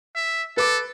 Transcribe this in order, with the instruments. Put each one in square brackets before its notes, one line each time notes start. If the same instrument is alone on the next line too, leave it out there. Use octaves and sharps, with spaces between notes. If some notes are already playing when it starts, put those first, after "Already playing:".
[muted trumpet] E5
[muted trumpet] A4 [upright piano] B4 D6